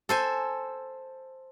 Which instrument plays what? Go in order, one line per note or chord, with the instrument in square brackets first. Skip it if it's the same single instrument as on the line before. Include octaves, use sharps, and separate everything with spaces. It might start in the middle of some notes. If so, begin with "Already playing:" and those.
[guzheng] A4 C5 G#5